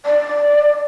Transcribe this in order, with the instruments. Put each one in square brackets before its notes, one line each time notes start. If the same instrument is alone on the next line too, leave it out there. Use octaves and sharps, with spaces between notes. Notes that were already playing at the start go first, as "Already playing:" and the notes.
[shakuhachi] D5